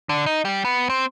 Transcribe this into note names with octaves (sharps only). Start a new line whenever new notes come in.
D3
D#4
G3
B3
C4